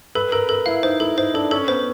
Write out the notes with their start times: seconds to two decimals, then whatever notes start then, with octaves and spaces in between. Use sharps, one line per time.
0.15 A4 B4
0.32 A4 A#4
0.49 A4 A#4
0.66 E4 F5
0.83 D#4 C5
1.00 E4 A4
1.17 D#4 C5
1.34 D4 A4
1.51 C#4 A4
1.68 B3 C5